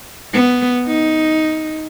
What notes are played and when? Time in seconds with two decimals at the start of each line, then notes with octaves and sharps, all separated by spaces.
0.33 B3
0.87 D#4